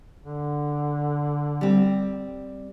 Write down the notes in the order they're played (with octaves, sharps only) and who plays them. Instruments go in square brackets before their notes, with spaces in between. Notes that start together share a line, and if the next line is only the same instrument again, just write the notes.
[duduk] D3
[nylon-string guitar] G3 C4